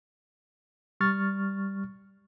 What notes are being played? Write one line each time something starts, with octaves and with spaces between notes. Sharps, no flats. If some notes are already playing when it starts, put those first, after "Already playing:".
G3 C#6 F6 A6